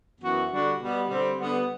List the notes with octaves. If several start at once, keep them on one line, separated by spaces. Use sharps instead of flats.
F#2 E3 B3 F#4
D3 G3 D4 F#4
B2 G3 B3
D3 G3 C4
D3 G3 B3